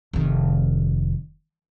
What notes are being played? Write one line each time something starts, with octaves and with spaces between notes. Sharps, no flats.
F1 D#3